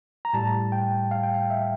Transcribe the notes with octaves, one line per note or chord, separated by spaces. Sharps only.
A#5
A2 G3 A5
G5
F5
G5
F5
E5